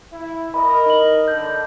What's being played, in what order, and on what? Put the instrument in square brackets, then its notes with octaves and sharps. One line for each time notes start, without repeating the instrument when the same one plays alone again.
[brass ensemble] E4
[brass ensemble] A#4 D#5 [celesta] B5
[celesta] D#4 F#7
[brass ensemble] D3 [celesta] G6